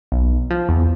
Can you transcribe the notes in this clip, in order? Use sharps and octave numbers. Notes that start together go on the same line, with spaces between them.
B1
F3
E2